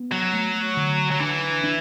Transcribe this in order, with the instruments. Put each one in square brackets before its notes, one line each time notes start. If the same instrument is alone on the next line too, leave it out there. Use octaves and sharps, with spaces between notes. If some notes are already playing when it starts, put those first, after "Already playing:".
Already playing: [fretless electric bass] B3
[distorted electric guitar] F#3
[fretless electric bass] A3
D3
[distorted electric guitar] F#3
[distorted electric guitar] E3 [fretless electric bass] D4
[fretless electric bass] D4